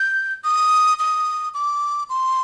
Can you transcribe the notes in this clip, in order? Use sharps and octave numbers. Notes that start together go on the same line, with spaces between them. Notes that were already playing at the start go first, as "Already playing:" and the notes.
Already playing: G6
D#6
D#6
D6
C6